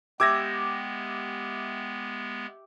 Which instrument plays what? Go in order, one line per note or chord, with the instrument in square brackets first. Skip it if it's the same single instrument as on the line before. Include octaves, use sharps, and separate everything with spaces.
[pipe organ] G#3 B3 [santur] G4 E5 [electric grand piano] D6 G#6 A#6